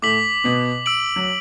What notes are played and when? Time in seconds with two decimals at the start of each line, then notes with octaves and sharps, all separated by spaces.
0.02 A2 A3 D6 B6 F#7
0.44 B2 B3
0.86 E6 D7 F#7
1.16 F#3